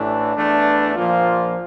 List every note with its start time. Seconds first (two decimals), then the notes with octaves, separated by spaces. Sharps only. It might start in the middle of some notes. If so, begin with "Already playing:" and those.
Already playing: A1 A2 E3 A3 D4
0.36 E2 E3 A3 D4
0.95 A#1 A#2 F3 A#3 F4